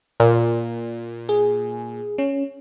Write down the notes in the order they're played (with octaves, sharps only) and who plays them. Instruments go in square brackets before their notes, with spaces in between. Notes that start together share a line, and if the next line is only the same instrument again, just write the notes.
[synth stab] A#2
[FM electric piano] G#4
C#4